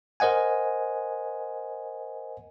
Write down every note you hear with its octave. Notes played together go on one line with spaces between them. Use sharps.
A#4 C5 D#5 F#5 G#5